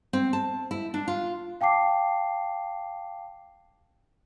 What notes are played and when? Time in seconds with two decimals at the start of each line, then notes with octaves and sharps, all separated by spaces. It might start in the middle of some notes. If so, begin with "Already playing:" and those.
0.13 C4
0.33 A5
0.71 E4
0.94 D4
1.08 F4
1.61 F5 G5 A5 D6 C7